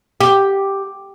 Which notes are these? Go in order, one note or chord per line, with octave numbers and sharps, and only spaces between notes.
G4